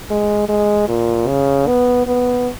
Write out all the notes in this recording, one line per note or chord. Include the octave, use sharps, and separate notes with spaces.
G#3
G#3
A#2
C#3
B3
B3